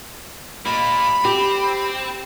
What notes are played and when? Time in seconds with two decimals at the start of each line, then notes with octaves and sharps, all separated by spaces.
0.65 D#2 A#2 A#3 B5
1.25 C4 G4